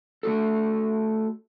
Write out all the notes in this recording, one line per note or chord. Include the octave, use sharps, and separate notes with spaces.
A3 F#4 A4